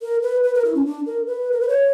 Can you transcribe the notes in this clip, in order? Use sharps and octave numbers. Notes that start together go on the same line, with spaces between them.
A#4
B4
B4
A#4
E4
C#4
D4
A#4
B4
A#4
B4
C#5